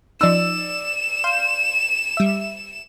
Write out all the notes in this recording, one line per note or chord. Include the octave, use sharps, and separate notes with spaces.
F3 D#4 D5 E6 E7
F5 C6 G6
G3 E5